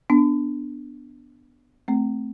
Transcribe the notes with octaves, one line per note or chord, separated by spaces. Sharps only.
B3 D4
A3 C4